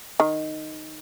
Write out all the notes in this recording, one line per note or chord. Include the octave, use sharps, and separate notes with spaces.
D#3